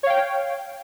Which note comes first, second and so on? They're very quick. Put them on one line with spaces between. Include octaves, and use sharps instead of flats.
C#5 F5 G5